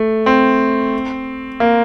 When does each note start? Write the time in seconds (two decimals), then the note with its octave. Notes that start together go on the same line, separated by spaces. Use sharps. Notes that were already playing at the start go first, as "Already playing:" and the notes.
Already playing: A3
0.26 C4
1.60 A#3